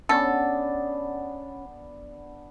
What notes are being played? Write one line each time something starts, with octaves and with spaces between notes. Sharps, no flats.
B3 C#4 D4 A4